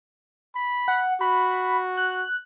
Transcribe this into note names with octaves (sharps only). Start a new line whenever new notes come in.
B5
F#5
F#4 B5
F#6